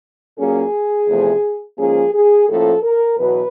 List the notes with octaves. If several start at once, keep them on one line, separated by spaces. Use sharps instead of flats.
A#2 F#3 A#3 C#4 G#4
E2 C3 F3 A3
G#2 F3 A#3 C#4 G#4
G#4
A2 F3 A#3 C#4 A4
A#4
E2 B2 F#3 B4